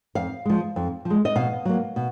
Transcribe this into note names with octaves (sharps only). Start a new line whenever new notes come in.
F2 F5
F3 G#3
F2
F3
G#3
D#5
B2 F5
F#3 A#3
B2